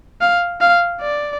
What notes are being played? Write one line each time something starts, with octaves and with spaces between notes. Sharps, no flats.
F5
F5
D5